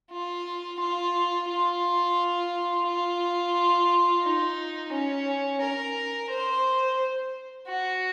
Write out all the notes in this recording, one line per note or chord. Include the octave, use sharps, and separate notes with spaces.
F4
F4
F4
F4
D#4
C#4
A#4
C5
F#4